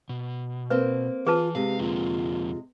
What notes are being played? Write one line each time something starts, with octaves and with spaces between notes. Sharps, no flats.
B2
A#3 C4 B4 C5
E3 F4 G#4 B4 A5
C3 G#3 G4 F5
F2 D3 A#3 F4